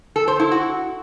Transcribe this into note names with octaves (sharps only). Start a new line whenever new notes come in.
A4
C5
E4
F#4